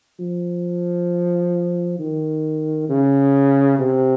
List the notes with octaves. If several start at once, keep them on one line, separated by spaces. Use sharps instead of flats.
F3
D#3
C#3
C3